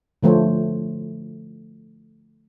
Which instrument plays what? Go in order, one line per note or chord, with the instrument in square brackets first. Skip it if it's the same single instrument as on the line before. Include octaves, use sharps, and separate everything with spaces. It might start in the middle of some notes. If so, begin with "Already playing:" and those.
[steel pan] D3 F3 A3 C5 C#5